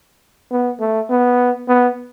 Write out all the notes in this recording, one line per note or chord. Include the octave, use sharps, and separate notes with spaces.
B3
A3
B3
B3